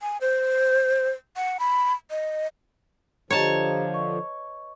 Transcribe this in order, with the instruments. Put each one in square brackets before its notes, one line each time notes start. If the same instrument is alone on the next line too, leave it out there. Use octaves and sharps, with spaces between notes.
[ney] G#5
C5
F#5
B5
D#5
[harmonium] D3 F3 [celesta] G4 D#5 A#5 [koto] C#5 A5
[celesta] B4 D#5 C#6